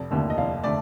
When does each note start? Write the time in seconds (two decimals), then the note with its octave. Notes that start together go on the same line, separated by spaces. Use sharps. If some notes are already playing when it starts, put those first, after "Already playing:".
Already playing: F1
0.11 D#2 D3 A3
0.30 D#5
0.38 F1 F5
0.64 D3 A3 D5